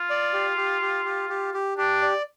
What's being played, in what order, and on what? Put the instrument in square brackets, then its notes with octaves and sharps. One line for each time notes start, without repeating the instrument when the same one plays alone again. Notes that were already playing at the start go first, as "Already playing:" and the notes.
Already playing: [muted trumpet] F4
[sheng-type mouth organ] D5
G4
G4
G4
G4
G4
G4
[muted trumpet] D4 [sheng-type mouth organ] G4
[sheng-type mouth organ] D5